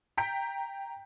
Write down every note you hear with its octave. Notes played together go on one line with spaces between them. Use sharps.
G5 A#5 G6 B6 D7